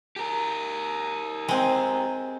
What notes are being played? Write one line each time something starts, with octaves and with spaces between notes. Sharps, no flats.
G4 A#4
G#3 C4